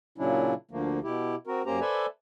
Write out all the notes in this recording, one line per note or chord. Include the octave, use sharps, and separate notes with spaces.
A#2 C#3 F#3 C#4 D4 E4
D2 D3 F3 A3 A#3
B2 E4 G4
C4 F#4 A#4
F#2 A#3 C#4 G4 C5 A#5
A4 B4 C5 D5 E5 G#5